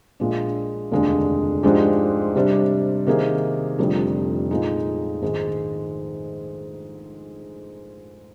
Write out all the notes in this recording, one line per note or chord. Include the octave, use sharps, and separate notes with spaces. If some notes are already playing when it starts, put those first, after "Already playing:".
A#1 A#2 G#3 D4
F1 D#2 D3 G#3 D4
G#2 F3 G#3 D4 G4
C3 G3 D4
C3 D#3 A#3 D#4 G#4
F1 F2 D3 G3
A#2 F3 G#3 D#4
A#1 G#2 D#3 G#3